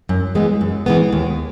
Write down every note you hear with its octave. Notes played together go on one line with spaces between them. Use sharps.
F#2
E3 G#3 B3
F#2
E3 G#3 B3
D#2